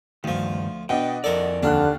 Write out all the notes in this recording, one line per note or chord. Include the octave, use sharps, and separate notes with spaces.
D2 G2 D#3 F3
B2 D4 D#5 F#5 G5
F2 A4 A#4 D5
D#2 D3 D4 F6 F#6